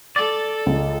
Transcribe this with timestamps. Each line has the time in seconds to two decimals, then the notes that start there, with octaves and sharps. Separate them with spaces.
0.16 A4 D5
0.66 C#2